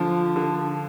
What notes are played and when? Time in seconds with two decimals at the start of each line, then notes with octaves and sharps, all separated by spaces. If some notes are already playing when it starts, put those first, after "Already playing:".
Already playing: D3 F3
0.36 D3